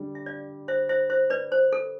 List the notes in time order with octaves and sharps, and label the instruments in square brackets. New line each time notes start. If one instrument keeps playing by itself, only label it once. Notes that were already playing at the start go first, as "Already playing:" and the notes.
Already playing: [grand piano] D3 G3
[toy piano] E5
D5 F5
C5 E5
C5 E5
C5 E5
B4 D5
C5
A4